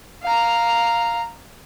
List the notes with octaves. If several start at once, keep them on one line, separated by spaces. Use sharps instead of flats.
F5 A#5